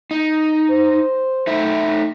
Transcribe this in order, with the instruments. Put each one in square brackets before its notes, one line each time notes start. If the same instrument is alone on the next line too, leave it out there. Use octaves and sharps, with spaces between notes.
[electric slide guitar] D#4
[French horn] C5
[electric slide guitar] A3 D#4 E5